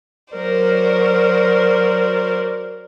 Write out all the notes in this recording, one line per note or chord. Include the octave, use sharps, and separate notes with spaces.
F#3 A#4 C5 D5